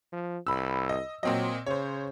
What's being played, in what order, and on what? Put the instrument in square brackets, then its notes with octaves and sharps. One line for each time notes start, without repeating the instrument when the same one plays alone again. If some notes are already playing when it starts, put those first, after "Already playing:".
[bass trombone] F3
[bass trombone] C2 [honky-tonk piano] B5 E6
[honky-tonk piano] D#5
[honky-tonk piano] A#2 C4 D#5 [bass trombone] F#3
[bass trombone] C#3 [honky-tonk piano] C5 C#5